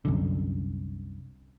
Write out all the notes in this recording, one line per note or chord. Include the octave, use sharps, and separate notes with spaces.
C2 F#2 D3